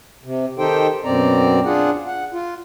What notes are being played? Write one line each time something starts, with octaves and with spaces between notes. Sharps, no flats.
C3
D#3 D#4 G4 A4 C5 G5
F#2 B2 C4 D5 A#5
D4 F4 G#4 F#5
F#5
F4